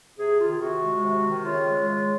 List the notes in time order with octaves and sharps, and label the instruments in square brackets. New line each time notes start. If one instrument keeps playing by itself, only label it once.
[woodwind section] C3 G#4
D#3 F4
G#4
C3 F#4
G#3
C3
D#3
C#3 F4
G#3
C#3